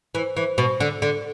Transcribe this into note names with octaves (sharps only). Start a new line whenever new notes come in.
E3
E3
B2
D3
D3